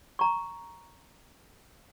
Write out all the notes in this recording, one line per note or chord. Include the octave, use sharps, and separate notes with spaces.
A#5 C#6